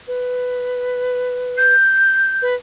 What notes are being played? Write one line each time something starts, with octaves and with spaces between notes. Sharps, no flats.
B4
G6
B4